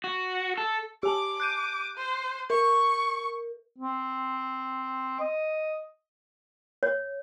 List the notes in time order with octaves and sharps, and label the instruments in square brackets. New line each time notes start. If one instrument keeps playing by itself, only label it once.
[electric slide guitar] F#4
A4
[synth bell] G4 G#5 A5 [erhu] D6
[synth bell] F#6 G6 D#7
[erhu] C5
[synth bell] A#4 [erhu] C#6
[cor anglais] C4
D#5
[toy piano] C#5